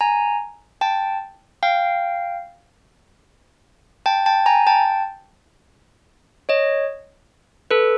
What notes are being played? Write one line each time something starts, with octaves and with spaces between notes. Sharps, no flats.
G#5 A#5
G5 A5
F5 G5
G5 A5
G5 A5
G#5 A#5
G5 A5
C#5 D#5
A4 B4